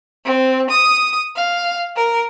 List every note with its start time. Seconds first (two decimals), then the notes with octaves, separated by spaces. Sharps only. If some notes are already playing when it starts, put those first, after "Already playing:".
0.25 C4
0.70 D#6
1.35 F5
1.96 A#4